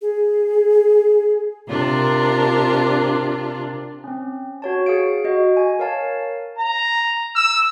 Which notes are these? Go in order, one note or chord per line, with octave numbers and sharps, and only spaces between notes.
G#4
C3 D4 F4 A#4
C4 C#4
F#4 C#5 A5
G#4 F5 D7
F#4 D#5
G#5
A#4 C#5 F5 A5
A#5
E6